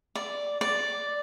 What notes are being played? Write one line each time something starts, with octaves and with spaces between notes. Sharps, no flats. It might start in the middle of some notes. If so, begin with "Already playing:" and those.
D5
D5